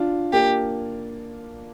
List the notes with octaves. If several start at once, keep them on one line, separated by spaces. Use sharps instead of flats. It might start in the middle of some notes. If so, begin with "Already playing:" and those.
Already playing: D4 F4
A#3 D4 G4